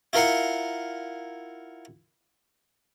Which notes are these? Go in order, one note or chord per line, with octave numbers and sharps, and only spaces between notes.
E4 F4 A#4 F5 F#5